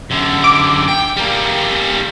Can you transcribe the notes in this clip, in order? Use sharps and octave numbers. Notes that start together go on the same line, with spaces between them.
F#2 D3
D6
G5
G3 A#3